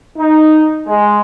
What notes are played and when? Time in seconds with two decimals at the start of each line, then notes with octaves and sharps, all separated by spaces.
0.17 D#4
0.87 G#3